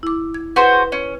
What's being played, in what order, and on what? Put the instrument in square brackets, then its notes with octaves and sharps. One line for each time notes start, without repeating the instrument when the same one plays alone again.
[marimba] E4 D6
G#6
[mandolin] F#4 G#4 C5 [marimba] B4
[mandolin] C#4